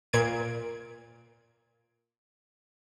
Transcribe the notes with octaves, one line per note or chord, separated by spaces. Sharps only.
A#2 G#6 D7